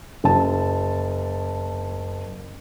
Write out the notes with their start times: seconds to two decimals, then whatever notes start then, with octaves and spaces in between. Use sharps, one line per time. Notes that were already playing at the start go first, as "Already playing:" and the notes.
0.24 F#1 A5